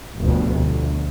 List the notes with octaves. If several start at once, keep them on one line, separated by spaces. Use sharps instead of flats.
F1 D2 B2
D2